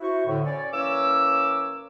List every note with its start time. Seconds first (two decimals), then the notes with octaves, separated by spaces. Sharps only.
0.01 E4 F#4 C5 C#6
0.26 A2 D3
0.45 C#4 C#5 D5
0.72 E3 A#3 C#4 C#5 D6 E6